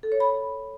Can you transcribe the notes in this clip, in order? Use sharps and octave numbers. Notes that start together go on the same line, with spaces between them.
A4
C#5
B5